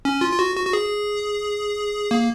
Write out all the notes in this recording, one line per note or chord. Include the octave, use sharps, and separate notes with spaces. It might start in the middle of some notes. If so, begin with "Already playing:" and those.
C#4
F4
F4
F#4
F#4
F#4
G#4
A#3